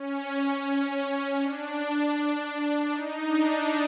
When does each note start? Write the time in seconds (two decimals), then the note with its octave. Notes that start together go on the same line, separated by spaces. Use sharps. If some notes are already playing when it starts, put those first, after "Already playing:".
Already playing: C#4
0.66 C#4
1.41 D4
2.91 D#4
3.28 D4